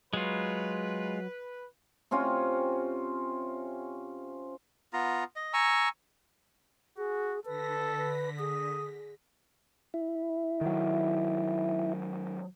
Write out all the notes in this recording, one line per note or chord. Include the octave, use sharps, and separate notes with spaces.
F#3 G#3 F4 B4
C3 C4 C#4 F4
B3 F4 A#5
D#5
G#5 A#5 C#6 E6
F#4 G#4
D3 A4 B4 A#6 B6
B4
G#4 D#6
E4
D#3 F#3